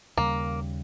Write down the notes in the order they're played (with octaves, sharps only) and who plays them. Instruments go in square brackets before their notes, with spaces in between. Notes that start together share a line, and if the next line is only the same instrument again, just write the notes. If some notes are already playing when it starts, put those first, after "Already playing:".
[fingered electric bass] D#2 C#3 G3 [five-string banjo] A#3